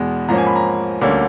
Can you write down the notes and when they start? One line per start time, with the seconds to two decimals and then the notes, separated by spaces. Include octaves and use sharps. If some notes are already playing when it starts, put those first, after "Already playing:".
Already playing: E2 B2 G#3 B3
0.29 G#2 F3 A#3 C#4 A#5
0.38 G#5
0.46 B5
0.56 A#5
1.01 D2 D3 G3 A#3 C#4